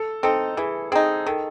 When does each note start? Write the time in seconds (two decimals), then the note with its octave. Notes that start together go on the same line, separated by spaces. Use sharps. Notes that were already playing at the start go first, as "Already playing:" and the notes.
Already playing: A4
0.23 C4 D#4 A4
0.57 E3 G#4
0.92 C4 D#4 G#4
1.26 D#3 A4